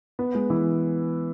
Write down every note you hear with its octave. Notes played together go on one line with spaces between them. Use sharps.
B3
G#3
E3